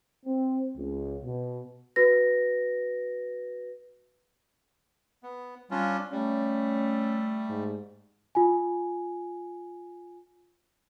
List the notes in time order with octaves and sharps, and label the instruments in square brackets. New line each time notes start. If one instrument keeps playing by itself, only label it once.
[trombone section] C4
C#2
B2
[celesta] F#4 B4 A#6
[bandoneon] B3
[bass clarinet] G3 [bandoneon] C#4 D4 F4
[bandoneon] G3 [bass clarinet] A3 [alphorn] C#4
[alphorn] G#2
[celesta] F4 G#5